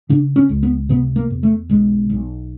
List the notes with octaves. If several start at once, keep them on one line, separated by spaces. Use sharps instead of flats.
C#3 D4
C#4
C#2
B3
C3 B3
A#3
E2
A3
B1 G#3
B1